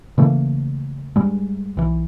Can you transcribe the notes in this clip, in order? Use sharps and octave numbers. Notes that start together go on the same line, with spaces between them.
C#3 E3 A3 A#3
G2 G3 G#3
B1 E3